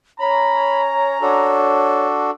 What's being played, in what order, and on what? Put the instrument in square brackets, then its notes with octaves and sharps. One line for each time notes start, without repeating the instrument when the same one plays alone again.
[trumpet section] C#4 A#5 [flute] C#5 [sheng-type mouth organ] B5
[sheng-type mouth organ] D4 F#4 A4 [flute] C#5